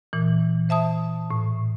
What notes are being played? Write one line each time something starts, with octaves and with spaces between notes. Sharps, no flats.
A#2 E3
C5 E5 A5 D#6
A2